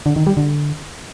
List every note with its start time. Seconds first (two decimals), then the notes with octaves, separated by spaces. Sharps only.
0.06 D3
0.16 D#3
0.27 G3
0.37 D3